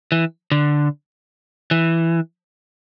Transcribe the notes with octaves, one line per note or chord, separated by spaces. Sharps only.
E3
D3
E3